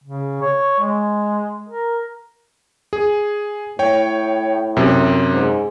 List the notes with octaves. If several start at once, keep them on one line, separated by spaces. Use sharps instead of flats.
C#3
C#5
G#3
A#4
G#4
A2 C#5 G5
F#2 C3
G#2